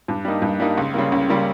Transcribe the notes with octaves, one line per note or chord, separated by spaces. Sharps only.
G2
G3 A#3 D#4
G2
G3 A#3 D#4
C#2
C#3 G3 A#3
C#2
C#3 G3 A#3